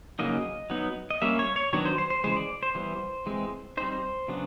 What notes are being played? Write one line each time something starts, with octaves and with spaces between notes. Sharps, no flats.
C#3 F#3 A#3 D#4 D#5
F#3 B3 D#4
D#5
G3 A#3 C#4 E5
C#5
C#5
D#3 F#3 B3 D4 C#5
C5
C5
C5
C#3 E3 G#3 C5
D5
C5
E3 G3 B3
E3 G#3 C4
G3 C4 D#4 C5
C#3 F#3 B3 D4